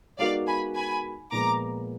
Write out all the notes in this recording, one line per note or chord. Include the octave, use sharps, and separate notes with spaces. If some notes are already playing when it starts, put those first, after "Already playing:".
G#3 B3 D#4 F#4 A#4 D5 F5
G#5 B5
G#5 B5
A#2 F3 G#3 B3 A#5 D6